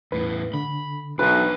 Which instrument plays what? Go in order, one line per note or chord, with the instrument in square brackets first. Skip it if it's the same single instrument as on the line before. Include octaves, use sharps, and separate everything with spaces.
[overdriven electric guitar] E2 A2 [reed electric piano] B4
[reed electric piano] D3 [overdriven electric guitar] B5
[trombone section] B1 [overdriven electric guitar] D4 C5 [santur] B4